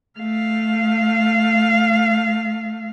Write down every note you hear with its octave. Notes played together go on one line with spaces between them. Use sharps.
A3 F5